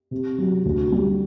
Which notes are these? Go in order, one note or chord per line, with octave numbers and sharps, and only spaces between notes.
C3
F#3
D2
G3